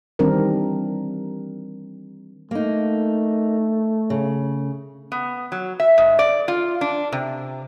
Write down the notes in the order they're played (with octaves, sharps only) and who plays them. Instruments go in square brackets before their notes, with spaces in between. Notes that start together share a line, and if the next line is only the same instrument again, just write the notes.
[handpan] D#3 E3 G3 C4 D4 A#4
[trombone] A3 [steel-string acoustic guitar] A#3 D#4
[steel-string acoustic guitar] C#3
[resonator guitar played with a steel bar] B3
F#3
E5
G#2
D5
F4
D4
C3